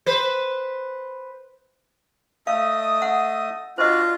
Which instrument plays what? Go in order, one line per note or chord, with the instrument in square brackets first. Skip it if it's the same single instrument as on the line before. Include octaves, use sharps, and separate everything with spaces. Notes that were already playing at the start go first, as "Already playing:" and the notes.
[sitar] B4 C5
[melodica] A3 D#5 D#6 [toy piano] F5
[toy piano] F#5
[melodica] D4 F#4 [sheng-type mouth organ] F4 [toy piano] C5 D#5